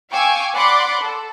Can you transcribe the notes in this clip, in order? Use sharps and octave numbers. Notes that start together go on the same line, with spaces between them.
F5 G5 G#5 C#6 D6 E6
D5 F#5 B5 C6 D6
A4